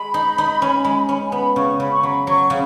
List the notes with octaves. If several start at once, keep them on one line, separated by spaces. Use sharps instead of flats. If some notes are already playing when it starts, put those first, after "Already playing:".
Already playing: G#3 B5
D#4
D#4
C#4
G#3
C#4
G#5
B3 B5
C#3 C#6
C#3 B5
C#6
F#3 B5
F#3 C#6
C#3 B5